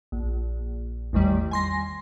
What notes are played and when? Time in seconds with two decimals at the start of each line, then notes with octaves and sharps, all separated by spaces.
0.12 A#1
1.13 A1 E2 D#3 G3
1.51 G#5 C6 A#6